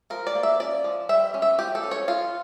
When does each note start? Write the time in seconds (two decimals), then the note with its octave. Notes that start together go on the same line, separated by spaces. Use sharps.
0.10 F3 A#4
0.27 D5
0.35 A#3
0.43 E5
0.60 C#4 D5
0.84 F3
1.09 G3 E5
1.34 C#4
1.42 E5
1.59 F3 G4
1.75 A4
1.83 C#4
1.91 C#5
2.08 F3 F4